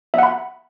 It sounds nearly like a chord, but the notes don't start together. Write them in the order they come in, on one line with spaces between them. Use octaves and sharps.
E5 F#5 B5